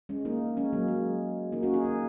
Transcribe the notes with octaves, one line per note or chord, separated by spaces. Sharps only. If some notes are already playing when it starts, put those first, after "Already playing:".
G#3 C#4
A#3 D#4
G#3 C#4
F#3 A#3
G#3
A#3 D#4
C#4 F#4
D#4 G#4
A#3 D#4